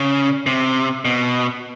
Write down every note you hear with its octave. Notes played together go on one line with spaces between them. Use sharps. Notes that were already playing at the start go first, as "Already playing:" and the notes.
Already playing: C#3
C3
B2